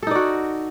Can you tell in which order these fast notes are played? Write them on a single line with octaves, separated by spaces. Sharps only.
A4 D#4 D5 F#4